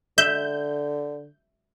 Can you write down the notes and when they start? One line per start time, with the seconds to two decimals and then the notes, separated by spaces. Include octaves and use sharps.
0.18 D3 E5 G6